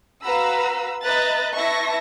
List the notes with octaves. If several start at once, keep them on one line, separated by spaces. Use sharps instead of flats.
F#4 B4 F5 A#5 B5 E6
B4 D#5 E5 A#5 F#6 A6
E4 B4 E5 A5 C#6 A#6